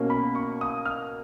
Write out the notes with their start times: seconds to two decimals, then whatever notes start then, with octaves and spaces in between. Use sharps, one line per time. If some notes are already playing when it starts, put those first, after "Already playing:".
Already playing: B2 A#3 C#4
0.10 B5
0.35 C#6
0.61 D#6
0.86 F6